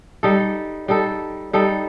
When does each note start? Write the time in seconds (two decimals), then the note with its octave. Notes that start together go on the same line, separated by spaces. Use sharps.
0.23 G3 D#4 A4
0.88 G3 D#4 A4
1.53 G3 D#4 A4